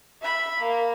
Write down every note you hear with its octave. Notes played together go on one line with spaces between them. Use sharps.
E5 B5
A#3